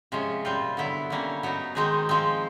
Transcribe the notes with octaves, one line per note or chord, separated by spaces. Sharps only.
C3 F3 G#3 C#4
A#2 G3 C4 F4
D3 F#3 B3 E4
D3 G3 A#3 C#4
F#3 B3 D#4
D#3 G#3 C4 D#4 G#4
F3 G#3 C4